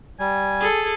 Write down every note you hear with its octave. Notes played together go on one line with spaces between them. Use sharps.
G3 G#5
G#4 A4